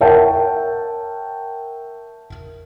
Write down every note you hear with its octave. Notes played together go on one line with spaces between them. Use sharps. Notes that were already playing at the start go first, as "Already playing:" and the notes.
A#4 C#5 E5 F#5 G5 A5